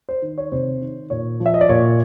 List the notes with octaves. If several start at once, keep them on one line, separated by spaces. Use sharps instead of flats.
C5
D#3
C#5
C3 C5
D#3
A#2 C#5
F3
E5
D#5
D5
A#2 C#5